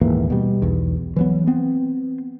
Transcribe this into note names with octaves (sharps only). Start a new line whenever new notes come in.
D#1 G#2 E3 A#3
B2 G3
B1 E2
E3 F#3 B3
B3 C4